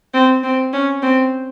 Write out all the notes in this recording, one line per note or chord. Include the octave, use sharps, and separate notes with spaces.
C4
C4
C#4
C4